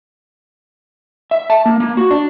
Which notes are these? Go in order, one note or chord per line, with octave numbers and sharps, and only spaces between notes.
E5
A5
A#3
A#3
F#4
D4